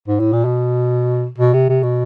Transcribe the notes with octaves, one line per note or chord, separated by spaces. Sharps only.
G#2
A2
A#2
B2
B2
C3
C3
B2